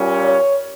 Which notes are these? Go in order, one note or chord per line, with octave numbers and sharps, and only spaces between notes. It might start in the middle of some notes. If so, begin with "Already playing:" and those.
Already playing: A#2 G3 C#4
C#5